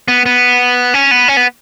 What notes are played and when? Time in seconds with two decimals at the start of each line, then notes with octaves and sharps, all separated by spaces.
0.08 B3
0.26 B3
0.94 C#4
1.11 B3
1.28 C#4
1.37 B3